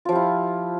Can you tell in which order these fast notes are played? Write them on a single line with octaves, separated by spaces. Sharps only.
F4 F3 G4 E4